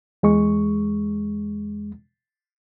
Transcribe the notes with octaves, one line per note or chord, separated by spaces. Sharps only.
E2 G#3 C#6